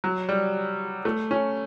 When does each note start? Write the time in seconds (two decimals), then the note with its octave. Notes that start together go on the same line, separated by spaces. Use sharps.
0.04 F#3
0.29 G3
1.05 A3
1.31 C#4